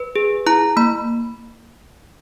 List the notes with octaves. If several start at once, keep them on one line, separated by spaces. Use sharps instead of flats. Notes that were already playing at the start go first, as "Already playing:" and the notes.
Already playing: B4
G#4
E4 A#5
A#3 B5